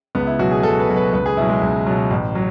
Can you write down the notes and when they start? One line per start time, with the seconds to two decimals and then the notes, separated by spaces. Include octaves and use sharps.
0.15 C#2 B3
0.27 E4
0.39 B2 F#3 F#4
0.51 G#4
0.63 C#2 A4
0.80 B4
0.88 B2 F#3
0.96 B4
1.13 C#2 B4
1.26 G#4
1.37 B2 F#3 E4
1.49 G#3
1.61 C#2
1.86 B2 F#3
2.10 A1
2.35 F#3